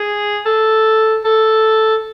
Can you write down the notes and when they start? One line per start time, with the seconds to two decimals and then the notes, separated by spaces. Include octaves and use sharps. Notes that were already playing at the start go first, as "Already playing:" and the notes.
Already playing: G#4
0.45 A4
1.24 A4